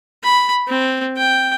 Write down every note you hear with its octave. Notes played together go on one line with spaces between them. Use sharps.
B5
C4
G5